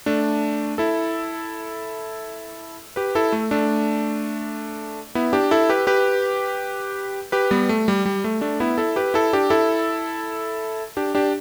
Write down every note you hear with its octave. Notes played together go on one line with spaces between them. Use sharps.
A3 D4
E4 A4
G4 B4
E4 A4
A3
A3 D4
B3 E4
D4 G4
E4 A4
G4 B4
G4 B4
G4 B4
G3 B3
A3
G3
G3
A3
A3 D4
B3 E4
E4 A4
G4 B4
E4 A4
D4 G4
E4 A4
D4 G4
D4 G4